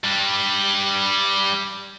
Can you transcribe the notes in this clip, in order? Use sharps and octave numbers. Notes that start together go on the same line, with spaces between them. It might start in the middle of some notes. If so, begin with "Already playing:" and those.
G3 D4